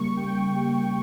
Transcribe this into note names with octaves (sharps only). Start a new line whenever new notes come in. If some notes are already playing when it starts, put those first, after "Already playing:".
Already playing: C#3 G3 A#3 C#6
G5